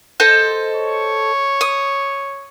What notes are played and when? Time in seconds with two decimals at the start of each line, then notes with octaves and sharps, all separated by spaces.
0.20 A4 C5 D#5
0.76 C#5
1.61 D#6